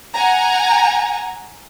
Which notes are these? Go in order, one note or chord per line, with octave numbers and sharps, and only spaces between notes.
F#5 G#5 A#5